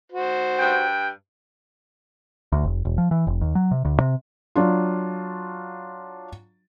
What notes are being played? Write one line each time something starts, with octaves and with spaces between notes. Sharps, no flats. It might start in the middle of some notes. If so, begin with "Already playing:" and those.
F#4 C5
G2 G5
D2
F1
E1
F3
E3
F1
D#2
F#3
C3
D2
C3
F#3 D4 F4